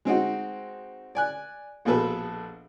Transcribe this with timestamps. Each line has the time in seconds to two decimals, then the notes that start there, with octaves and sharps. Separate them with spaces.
0.05 G#3 C4 D#4 F#4
1.15 D5 G#5 F#6
1.85 A#1 B2 G#4 A4 B4